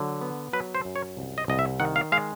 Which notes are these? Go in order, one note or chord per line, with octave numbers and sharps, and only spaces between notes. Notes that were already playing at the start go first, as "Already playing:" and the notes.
Already playing: D3 F#3
B3
F#3 B4
C5
F#2
C#5
C2
D#5
C2 D#5
E5
D#3 F#5
F5
G#3 F5